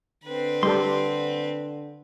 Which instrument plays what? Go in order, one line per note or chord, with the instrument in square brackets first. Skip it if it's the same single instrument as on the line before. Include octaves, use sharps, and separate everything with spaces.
[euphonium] D3 [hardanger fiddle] C4 B4
[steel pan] G3 G4 A4 [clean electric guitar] C6